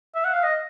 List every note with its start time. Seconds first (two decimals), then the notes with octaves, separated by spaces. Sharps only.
0.15 E5
0.25 F#5
0.33 F5
0.43 D#5